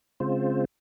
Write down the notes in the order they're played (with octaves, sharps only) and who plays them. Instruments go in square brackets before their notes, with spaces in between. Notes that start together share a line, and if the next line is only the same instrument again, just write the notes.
[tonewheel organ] C#3 G#3 C4 F4 C5